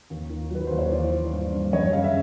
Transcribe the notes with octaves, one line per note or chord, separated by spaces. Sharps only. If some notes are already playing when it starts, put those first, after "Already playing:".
D#2
D#3
F#3 B4
D#2 C5
C#5
E3 C5 D5
E3
G2
G2
F#2 C#5 D#5
C#3 F5
E5